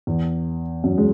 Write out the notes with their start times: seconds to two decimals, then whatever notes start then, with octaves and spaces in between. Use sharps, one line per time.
0.07 E2
0.84 F#2
0.98 G#3